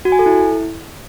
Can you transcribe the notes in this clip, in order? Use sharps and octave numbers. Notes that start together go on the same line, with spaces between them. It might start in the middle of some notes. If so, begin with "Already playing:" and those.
F#4
G#5
A4
E4